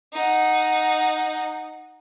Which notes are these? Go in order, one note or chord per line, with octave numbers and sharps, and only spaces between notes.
D#4 F#5